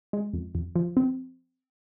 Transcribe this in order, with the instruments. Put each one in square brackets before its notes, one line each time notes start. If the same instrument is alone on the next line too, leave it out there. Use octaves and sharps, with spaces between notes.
[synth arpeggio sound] G#3
F2
F2
F3
C4